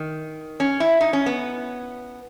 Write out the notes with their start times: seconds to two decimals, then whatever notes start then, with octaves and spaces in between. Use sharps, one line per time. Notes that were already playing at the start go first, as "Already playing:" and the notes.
Already playing: D#3
0.60 C#4
0.80 E4
1.01 D#4
1.13 C#4
1.26 B3